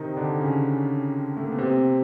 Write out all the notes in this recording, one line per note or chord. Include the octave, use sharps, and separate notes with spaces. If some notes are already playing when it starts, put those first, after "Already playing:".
Already playing: C3 D#3 C4 D#4
D3 D4
C#3 C#4
A3
A#3
B3
C3 C4